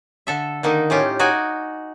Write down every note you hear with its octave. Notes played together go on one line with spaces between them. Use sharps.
D3 A4 E5
D3 D#3 A#3 D#4
A2 C#4 F4 G4
D#4 F#4 D5 G#5